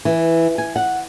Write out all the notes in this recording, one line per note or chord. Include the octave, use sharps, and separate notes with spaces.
E3
G#5
F#5